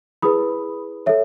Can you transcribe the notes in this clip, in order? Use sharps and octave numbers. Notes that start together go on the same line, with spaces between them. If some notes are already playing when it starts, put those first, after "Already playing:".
E4 G#4 B4 B5 D#6
A4 C#5 E5